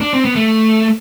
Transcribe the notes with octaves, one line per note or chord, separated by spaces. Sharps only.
D4
C4
B3
A3